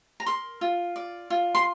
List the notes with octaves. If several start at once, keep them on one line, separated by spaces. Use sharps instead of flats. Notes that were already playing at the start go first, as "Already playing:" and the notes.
A#5
A#4 C6
F4
D5
F4
C6